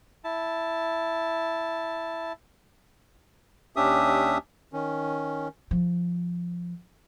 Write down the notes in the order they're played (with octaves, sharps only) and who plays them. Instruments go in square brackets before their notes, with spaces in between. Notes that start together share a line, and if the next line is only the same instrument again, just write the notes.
[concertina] E4 A5
[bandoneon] D#2 C#4 D4 G4 E5 D#6
D#3 C#4
[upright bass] F3